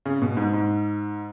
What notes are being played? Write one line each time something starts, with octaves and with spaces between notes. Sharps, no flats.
C#3
B2
G#2
G#2